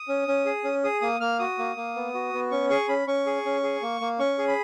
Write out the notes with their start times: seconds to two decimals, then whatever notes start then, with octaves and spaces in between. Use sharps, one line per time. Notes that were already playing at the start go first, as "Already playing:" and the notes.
Already playing: D#6
0.09 C#4
0.28 C#4
0.45 G#4
0.64 C#4
0.84 G#4 D#6
1.01 A#3 D#6
1.20 A#3 F6
1.39 F#4 D#6
1.59 A#3
1.76 A#3
1.96 B3
2.14 F#4
2.33 B3
2.51 C#4 C#6
2.70 G#4 C#6
2.88 C#4 B5
3.07 C#4 C#6
3.26 G#4
3.45 C#4
3.63 G#4
3.82 A#3
4.01 A#3
4.19 C#4 C#6
4.38 G#4
4.48 B5